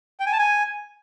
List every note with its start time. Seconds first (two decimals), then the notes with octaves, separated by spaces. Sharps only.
0.20 G5
0.26 G#5
0.33 A5
0.39 G#5